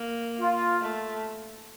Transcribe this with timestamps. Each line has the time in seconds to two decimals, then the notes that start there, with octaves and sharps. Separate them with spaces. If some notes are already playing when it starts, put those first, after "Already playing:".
Already playing: A#3
0.39 F4
0.82 A3